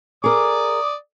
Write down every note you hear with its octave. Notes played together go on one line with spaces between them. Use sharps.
G#4 A#4 D5 D6 D#6